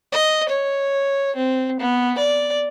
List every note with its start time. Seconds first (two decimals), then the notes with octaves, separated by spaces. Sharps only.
0.13 D#5
0.49 C#5
1.36 C4
1.80 B3
2.18 D5